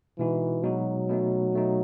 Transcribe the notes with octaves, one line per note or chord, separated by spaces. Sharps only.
B2 E3 G#3 D#4 F#4
B2 F#3 G#3 D#4 F#4
B2 A3 D#4
B2 A3 D#4